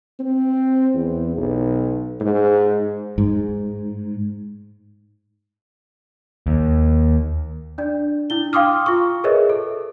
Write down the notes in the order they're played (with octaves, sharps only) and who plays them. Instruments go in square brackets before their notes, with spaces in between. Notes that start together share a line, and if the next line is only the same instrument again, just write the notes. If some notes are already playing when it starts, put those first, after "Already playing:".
[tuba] C4
E2
B1
G#2
[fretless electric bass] G#2
[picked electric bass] D#2
[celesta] D4 D5
D4 E4 G7
F5 G5 C6 D6 D#6 F6
F4 C#6
G#4 A#4 B4 C#5 D#5 E5
A4